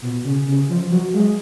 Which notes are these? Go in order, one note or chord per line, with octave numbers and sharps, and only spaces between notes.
B2
C#3
C#3
F3
F#3
G#3